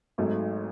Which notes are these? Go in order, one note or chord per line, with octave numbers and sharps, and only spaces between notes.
G#1 G#2 F#3 A3